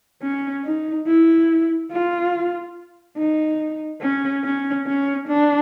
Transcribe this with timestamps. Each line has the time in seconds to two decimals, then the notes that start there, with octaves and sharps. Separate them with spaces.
0.22 C#4
0.65 D#4
1.07 E4
1.92 F4
3.18 D#4
4.01 C#4
4.44 C#4
4.87 C#4
5.28 D4